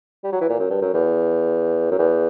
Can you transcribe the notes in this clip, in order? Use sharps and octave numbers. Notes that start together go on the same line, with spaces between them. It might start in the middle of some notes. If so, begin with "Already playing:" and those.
G3
F#3
E3
A#2
F#2
G2
F#2
E2
F#2
E2